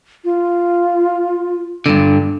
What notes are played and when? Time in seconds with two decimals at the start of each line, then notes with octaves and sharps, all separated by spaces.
0.24 F4
1.86 G2 D3